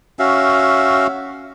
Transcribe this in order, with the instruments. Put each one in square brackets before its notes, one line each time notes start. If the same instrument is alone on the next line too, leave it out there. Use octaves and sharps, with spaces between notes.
[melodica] C#4 F#4 E5 F5